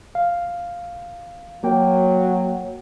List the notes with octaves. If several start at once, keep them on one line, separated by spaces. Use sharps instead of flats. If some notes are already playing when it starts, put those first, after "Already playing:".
F5
F#3 A#3 G5